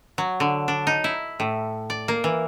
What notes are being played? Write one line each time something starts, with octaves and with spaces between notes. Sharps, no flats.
F#3
D3
D4
D#4
E4
A2
D5
A#3
E3